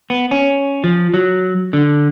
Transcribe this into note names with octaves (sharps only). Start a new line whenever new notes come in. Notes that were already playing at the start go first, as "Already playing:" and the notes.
B3
C#4
F3
F#3
D3